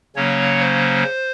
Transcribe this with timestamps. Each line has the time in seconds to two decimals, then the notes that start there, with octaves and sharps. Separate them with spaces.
0.16 C#3 F#3 A#3 C#4 C#5
0.60 C5